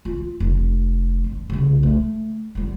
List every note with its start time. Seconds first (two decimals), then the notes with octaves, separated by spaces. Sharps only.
0.05 F4
0.40 F1
1.24 G2
1.50 C2 C#3
1.83 A3
2.55 F#3 G3